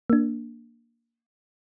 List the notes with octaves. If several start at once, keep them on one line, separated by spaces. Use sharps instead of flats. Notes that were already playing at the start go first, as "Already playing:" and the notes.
A#3 D4